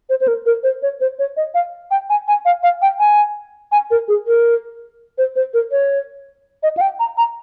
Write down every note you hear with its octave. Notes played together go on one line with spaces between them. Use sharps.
C5
C5
A#4
A#4
C5
C#5
C5
C#5
D#5
F5
G5
G#5
G#5
F5
F5
G5
G#5
G#5
A#4
G#4
A#4
C5
C5
A#4
C#5
D#5
F5
G5
A#5
A#5